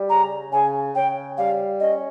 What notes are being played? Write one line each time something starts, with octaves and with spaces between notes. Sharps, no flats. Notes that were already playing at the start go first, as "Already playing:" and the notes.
Already playing: G3
C#3 A#5
C#3 G#5
C#3 G5
G3 F5
C#4 D#5